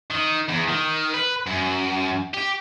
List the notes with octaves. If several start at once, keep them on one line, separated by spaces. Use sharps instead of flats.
D#3
E2
D#3
B4
F#2
G4